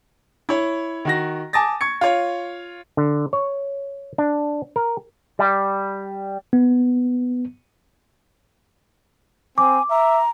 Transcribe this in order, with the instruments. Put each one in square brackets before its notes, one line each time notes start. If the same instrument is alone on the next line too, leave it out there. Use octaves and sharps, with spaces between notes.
[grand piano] E4 C#5
D#3 F#4 A#6
G#5 A5 D6 D#6 A6 A#6
C#6 G#6 C#7
F4 C#5
[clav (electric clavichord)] D3
C#5
D4
A#4
[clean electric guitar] G3
[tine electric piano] B3
[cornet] C4 [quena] G#5 [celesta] D6
[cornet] E5 [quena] A#5